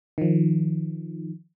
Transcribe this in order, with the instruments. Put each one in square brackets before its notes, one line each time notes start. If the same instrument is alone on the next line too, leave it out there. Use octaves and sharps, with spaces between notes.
[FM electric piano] D#3 F3